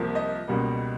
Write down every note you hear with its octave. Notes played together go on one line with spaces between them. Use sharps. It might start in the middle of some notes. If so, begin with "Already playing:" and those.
Already playing: C2 C3 F3 A#3
D#5
C#2 B2 G3 A#3